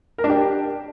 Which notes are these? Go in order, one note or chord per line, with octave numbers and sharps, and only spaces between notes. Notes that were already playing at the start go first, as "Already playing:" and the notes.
A#4
D4
G4